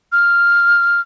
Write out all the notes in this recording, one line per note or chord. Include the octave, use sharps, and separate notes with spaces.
F6